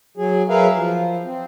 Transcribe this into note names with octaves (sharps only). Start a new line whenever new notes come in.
F#3 G#4
F#3 G#4 A#4 B4 E5 F5
F3
C4